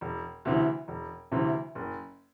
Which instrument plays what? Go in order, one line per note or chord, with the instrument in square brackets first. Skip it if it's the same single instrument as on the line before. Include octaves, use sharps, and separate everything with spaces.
[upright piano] E1
D2 C3 E3
E1
D2 C3 E3
F#1